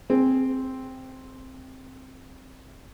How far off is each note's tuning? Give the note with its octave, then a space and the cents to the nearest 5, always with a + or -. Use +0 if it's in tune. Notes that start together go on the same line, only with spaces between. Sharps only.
C4 +0 G#4 -5